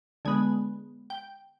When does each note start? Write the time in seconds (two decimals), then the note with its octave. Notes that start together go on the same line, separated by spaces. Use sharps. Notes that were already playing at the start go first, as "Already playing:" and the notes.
0.25 D3 G#3 B3 G#5
1.10 G5